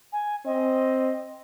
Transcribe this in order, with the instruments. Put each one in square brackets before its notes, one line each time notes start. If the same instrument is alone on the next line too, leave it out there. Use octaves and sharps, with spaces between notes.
[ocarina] G#5
[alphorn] C4 [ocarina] D#5